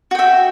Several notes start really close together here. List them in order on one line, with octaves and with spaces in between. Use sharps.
F#4 G5 E5